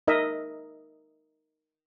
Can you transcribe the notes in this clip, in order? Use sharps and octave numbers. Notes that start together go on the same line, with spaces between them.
D#4 A#4 D#5 E5